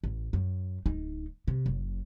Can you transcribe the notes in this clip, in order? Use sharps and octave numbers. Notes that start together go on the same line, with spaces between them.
A1
F#2
D1 D#4
C3
F#1